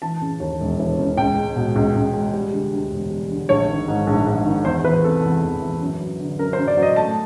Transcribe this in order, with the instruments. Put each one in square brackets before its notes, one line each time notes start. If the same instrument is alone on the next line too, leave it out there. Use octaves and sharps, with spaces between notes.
[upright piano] E3 A5
C#3
D#2
E1
E3
C#3
C#2 G5
G#3
B2
C#2
C#2
G#3
G3
D3
D2
E1
G3
D3
A#1 C#5
D#3
G#2
A#1
A#1
D#3
E2 C5
E3 B4
C3 A4
E2
E2
E3
F#2
F#3
D3
F#2 A#4
C5
F#2
D5
F#3
D#5
A3 A5